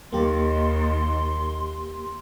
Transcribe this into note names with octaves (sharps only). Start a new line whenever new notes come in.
D#2 A#3 G4 C6